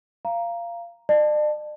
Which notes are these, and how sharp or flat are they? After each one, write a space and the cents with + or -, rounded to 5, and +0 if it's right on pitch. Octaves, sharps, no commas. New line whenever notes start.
F5 -20 A#5 +5
D5 +45 A5 +0